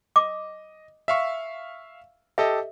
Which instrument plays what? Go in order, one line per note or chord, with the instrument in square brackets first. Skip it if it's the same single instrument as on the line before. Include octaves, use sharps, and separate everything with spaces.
[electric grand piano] D#5 [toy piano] D6
[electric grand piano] E5 F5 C#6
[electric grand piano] G4 A4 D#5 [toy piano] E5